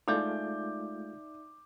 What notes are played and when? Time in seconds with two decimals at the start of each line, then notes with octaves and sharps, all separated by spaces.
0.08 G#3 A3 D#4 F4 D5 E5 D6 G6